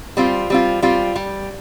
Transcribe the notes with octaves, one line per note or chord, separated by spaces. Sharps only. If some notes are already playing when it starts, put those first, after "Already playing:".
G3 C4 F4
G3 C4 F4
G3 C4 F4
G3